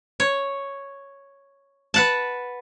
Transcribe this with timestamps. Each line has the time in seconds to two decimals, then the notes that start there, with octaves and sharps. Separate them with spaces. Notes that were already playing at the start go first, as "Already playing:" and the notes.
0.20 C#5
1.94 B4 F#5 A5